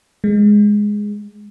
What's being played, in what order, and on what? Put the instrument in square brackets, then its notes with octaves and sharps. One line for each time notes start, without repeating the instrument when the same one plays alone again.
[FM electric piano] G#3